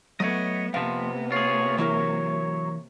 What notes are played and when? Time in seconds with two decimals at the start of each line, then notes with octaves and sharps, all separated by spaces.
0.20 F#3 A3 B3 C#5 D#5
0.74 F2 C3 F3 A#3 B3 F5
1.32 F4 G#4 C#5
1.78 E3 F#3 E4 A#4 C#5